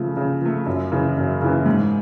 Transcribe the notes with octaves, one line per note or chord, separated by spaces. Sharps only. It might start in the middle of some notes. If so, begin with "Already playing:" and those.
Already playing: C#3 F3 A3
C#3
F3 A3
F#2
C#3 E3
F#2
C#3 E3
G#2